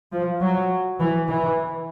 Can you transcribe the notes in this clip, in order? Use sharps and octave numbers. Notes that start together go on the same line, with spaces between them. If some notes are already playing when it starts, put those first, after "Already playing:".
F3
F#3
E3
E3